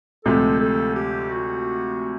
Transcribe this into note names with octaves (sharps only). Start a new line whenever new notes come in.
D2 C3 F3 G#3 A4
A4
G4
F#4